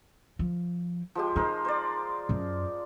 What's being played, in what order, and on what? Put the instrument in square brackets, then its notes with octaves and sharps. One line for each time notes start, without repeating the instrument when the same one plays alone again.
[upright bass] F3
[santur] F3 G#3 G4
[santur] G#3 A#4 C5 [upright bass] D#4
[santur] C5 D5
[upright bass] F#2